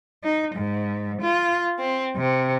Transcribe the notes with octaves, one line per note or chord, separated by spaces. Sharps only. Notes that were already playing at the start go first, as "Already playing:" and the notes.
D#4
G#2
F4
C4
C3